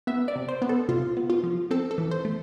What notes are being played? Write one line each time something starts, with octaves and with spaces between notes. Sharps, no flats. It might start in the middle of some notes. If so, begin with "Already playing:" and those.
B3 E5
D5
C3
C5
B3
A4
C3 F4
B3
F4
F3
C4 A4
A4
E3
C5
A3